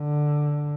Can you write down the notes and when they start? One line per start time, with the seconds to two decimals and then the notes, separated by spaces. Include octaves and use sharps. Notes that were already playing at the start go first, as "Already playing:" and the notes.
Already playing: D3